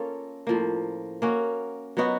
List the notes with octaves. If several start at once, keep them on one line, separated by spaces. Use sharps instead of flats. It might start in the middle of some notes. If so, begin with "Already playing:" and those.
Already playing: A#3 C#4 F4 A4
A2 F3 A#3
A#3 C#4 F#4
F#3 B3 D#4 F#4